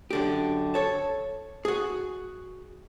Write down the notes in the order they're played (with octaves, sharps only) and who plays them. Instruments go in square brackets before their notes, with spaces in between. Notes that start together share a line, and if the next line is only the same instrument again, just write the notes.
[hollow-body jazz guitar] F#2 D3 G4
A4 C#5 A5
F#4 G#4